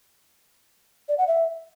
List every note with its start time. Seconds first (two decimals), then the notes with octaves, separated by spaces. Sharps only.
1.09 D5
1.18 F#5
1.28 E5